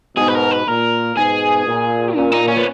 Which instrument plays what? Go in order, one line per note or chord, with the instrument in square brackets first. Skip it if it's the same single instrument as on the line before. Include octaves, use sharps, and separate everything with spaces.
[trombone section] G#2 B2 [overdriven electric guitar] G#4
[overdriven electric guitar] B4
A#4
B4
[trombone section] A#2 [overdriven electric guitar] A#4
[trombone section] G#2 B2 [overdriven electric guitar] G#4
[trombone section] A#2
[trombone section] A#2 [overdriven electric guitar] C#4
[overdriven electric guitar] D#4
C#4
B3